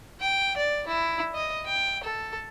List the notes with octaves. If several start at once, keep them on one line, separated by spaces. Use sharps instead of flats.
G5
D5
E4
D#5
G5
A4